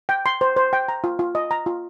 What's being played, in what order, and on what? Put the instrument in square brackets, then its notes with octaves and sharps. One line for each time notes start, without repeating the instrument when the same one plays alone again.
[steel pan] G5
C6
C5
C5
G5
A#5
F4
F4
D#5
A#5
F4